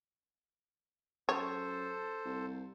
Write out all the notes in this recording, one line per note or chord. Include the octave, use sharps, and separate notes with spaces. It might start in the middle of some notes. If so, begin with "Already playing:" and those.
F#2 A4 C5 C#5
C2